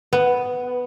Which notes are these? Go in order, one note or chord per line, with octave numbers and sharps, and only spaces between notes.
B3